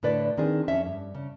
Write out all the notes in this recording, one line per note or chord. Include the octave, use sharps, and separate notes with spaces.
A2 D3 B4 D5
D#3 C4 D4 G#4
F2 C#4 E5
G2
C#3